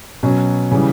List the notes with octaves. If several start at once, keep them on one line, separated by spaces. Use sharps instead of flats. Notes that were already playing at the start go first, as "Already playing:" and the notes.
B2 F#3 C#4
C#3 E3 G3